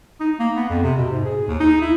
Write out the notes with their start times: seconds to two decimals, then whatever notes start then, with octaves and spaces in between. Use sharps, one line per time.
0.20 D#4
0.39 A#3
0.56 B3
0.69 F2
0.83 C3
0.97 B2
1.10 G#2
1.25 G#4
1.47 D#2
1.60 D#4
1.81 E4